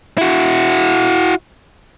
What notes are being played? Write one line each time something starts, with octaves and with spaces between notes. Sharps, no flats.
E4 F#4